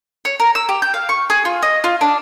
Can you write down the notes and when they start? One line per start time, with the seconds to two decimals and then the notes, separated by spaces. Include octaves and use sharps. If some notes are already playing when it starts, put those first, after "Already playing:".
0.25 C#5
0.40 A#4
0.55 E6
0.69 G4
0.82 G6
0.94 F5
1.09 C#6
1.30 G#4
1.45 F4
1.62 D#5
1.84 F4
2.01 D4